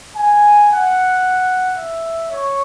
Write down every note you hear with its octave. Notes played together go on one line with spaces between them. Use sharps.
G#5
F#5
E5
C#5